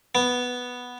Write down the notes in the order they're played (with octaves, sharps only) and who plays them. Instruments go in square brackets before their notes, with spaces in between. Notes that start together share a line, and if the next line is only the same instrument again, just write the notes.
[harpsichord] B3